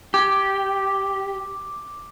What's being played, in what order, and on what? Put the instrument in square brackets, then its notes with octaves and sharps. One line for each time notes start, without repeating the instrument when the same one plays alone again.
[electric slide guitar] G4 [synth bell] D6